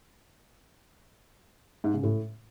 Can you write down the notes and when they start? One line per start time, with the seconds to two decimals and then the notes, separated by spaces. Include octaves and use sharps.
1.84 G#2
1.94 C#3
2.03 A2